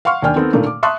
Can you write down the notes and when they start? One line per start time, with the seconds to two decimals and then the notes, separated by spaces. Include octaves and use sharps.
0.05 F5 F#5 C6 C#6 F6
0.22 D#2 A#3 D4 G5 G#5 F6
0.36 D#3 B3 C4 A4
0.53 A#2 D3 D#3 A3 A#3
0.66 D6
0.83 E5 A5 C6 C#6 D#6 F#6